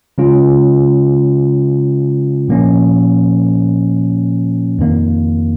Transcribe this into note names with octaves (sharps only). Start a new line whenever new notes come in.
C#3 G#3 C#4 F4
A#2 F3 A#3 C#4
F2 D#3 A#3